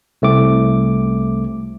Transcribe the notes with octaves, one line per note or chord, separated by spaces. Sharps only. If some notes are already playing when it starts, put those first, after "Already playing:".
C2 A3 C4 D6